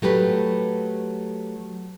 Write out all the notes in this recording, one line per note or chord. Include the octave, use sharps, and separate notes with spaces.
F#3 A3 G4 B4